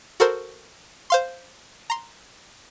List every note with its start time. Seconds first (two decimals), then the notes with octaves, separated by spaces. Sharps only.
0.20 F#4 A4 A#4 C5
1.10 C5 F5 C6
1.90 A#5 C6